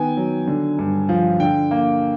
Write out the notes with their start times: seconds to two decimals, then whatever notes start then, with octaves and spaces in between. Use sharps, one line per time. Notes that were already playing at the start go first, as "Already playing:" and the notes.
Already playing: D#3 B3 G5 G#5
0.17 F#3
0.47 D3
0.79 G2
1.09 F3
1.40 D3 G5
1.71 A#3